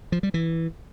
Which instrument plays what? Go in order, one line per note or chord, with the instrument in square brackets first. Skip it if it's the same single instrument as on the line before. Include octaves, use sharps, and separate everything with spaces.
[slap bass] F3
G3
E3